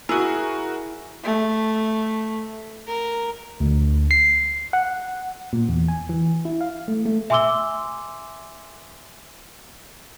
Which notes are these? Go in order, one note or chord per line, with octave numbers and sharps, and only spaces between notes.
E4 F#4 G#4 A#4 G#5
A3
A#4
D2
C7
F#5
A#2
E2
G#5
E3
E4
F5
A3
A3
E5 G#5 C6 D6 E6 G7